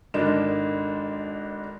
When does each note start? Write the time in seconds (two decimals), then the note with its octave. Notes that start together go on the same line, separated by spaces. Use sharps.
0.14 G#1 D3 D4 D#4 A#4 E7